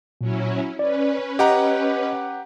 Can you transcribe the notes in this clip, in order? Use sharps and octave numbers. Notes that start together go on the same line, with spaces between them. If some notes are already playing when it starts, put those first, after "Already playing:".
A#2 F#3 C#4 E4
C#4 B4 D5
G4 D#5 F#5 A#5